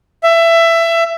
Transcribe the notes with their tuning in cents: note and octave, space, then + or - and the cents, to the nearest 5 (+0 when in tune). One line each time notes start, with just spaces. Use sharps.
E5 +20